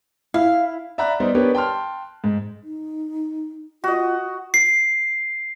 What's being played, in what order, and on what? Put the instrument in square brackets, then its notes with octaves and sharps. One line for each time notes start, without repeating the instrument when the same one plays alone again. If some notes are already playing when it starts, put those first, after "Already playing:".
[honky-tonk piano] E4 [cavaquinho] F5
[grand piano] D5 E5 F#5 A#5 B5 F#6
G3 B3 D#4 C5 D5
B3 D4 G4 A#4 B4 C#5
G5 A5 C6 F6
G#2
[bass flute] D#4
[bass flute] F4 [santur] F#4 D#5
[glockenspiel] C7